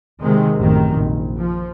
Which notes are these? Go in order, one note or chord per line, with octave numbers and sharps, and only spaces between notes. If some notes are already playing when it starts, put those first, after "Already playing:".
C3 D#3 G#3
A1 F#2 C3 D#3
A#1
F3